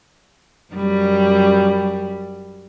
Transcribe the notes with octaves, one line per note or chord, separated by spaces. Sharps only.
F#2 G3